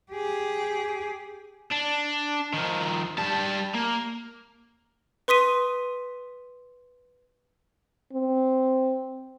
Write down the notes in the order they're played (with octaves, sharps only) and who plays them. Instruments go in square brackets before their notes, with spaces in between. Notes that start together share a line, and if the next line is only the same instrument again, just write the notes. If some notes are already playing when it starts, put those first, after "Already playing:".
[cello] G4 G#4
[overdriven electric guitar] D4
D#3 F3
G3 A5
A#3
[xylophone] B4 C6 D#6 B6 D#7
[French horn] C4